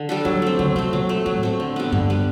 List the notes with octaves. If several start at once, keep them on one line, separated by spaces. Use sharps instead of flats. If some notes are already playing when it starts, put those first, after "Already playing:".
Already playing: D3
G3 D4 A4
E3 F#3
A3 C4
D3 F#3
C3 A3 C4
B2 F#3
A3 C4
A2 F#3
A3 C4
D3
G3 B3
G2 D3
G3 B3